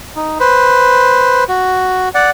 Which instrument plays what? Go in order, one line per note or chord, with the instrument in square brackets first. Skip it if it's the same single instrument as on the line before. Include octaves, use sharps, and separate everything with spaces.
[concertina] D#4
B4 C5
F#4
D5 F#5